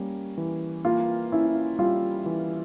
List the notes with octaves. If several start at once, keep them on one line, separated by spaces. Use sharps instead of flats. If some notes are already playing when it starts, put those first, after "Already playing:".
Already playing: G3 A#3 C#4
E3
A#3 F4
C#4 E4
G3 F4
E3